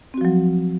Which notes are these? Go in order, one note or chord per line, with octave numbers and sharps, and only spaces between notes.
F3 F#3 C4 F#4